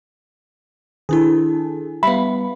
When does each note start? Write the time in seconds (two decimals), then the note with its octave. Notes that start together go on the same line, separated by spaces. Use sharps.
1.09 D#3 D4 E4 G#4 A4
2.03 G3 B3 E5 F5 B5